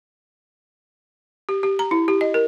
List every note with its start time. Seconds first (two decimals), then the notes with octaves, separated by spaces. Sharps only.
1.49 G4
1.63 G4
1.79 A#5
1.91 E4
2.08 G4
2.21 D#5
2.34 A#4